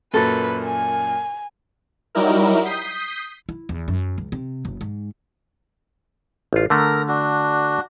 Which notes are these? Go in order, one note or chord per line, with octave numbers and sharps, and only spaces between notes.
F#2 A#2 A4 B4
G#5
F#3 G3 D#4 E4 A#4
D#6 G6 B6 C7
E4
E2
F#2
C#2
C3
F#1
G#2
A1 F4
D3 A3 A#4 A#5
D4 F#4